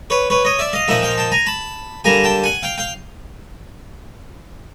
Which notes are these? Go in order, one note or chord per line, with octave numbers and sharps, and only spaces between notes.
B4 C#5
B4 C#5
C#5 D#5
D5 E5
D#5 F5
A#2 F3 A#3 D#4 E5 F#5
F5 G5
G5 A5
G#5 A#5
A5 B5
D3 G3 A#3 G#5 A#5
G5 A5
F#5 G#5
F5 G5
F5 G5